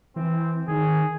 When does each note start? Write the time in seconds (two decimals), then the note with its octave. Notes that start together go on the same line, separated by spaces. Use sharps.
0.16 E3 C4
0.68 D#3 G#4